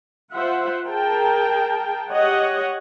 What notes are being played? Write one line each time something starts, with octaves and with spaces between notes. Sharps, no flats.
F4 C5 E5 F#5
G#4 A#4 G5 A5
G4 C#5 D#5 F#5